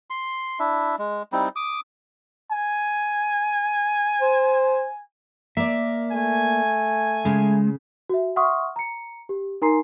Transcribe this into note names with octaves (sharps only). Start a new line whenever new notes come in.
C6
D4 E4 E5
G#3
G3 C4 D#4 E4
D6 D#6
G#5
C5
A#3 D5 E5
A3 G#5
C#3 G#3
F#4 E5
E5 F#5 C6 C#6 D#6 F6
A#5 C#7
G4
D#4 A#4 G#5 A#5 C6 C7